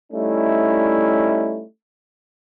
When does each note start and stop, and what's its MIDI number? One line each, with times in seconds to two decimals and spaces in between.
0.12 1.63 55
0.12 1.63 57
0.12 1.63 61
0.12 1.63 63
0.12 1.63 64